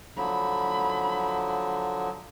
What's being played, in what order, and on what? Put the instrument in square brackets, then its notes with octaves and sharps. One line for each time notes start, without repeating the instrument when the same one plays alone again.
[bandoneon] D3 F3 F#3 [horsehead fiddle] B5